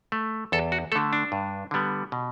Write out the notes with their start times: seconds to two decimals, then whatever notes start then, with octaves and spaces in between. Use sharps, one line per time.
0.12 A3
0.52 E2 A4
0.72 F#4
0.92 D3 A3 A4
1.13 D4
1.32 G2
1.71 D3 G3 B3
2.12 B2